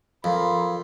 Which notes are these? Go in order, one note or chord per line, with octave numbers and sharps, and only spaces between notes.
F2 A#4 B5 C6